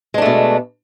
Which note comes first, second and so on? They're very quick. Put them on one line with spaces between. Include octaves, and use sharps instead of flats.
G#3 D4 A3 B2